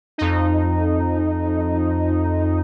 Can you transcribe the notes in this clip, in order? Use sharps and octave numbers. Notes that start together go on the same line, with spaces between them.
F2 D#4